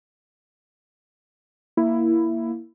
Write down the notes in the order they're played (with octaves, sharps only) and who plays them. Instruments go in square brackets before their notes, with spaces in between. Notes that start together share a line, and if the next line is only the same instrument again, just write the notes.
[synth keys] A#3 E4